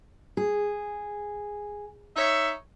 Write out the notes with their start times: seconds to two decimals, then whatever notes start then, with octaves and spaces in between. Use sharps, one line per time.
0.37 G#4
2.15 D#4 C#5 E5